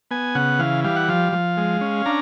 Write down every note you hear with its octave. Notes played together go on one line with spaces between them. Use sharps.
B3 G#5
C#3 F#5
E3 F5
G3 F5
F#5
F3 F5
F3
G#3
C#4
D4 A#5